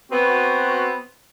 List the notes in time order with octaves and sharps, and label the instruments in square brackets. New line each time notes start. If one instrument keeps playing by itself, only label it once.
[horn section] B3 C4 F#4